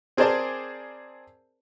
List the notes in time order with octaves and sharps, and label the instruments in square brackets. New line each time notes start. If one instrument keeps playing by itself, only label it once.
[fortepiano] C4 G#4 A#4 C5 D5 A5